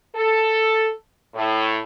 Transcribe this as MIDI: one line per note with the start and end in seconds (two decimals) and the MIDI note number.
0.15 0.91 69
1.35 1.80 45